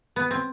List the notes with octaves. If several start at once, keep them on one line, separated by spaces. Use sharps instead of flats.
B3
C4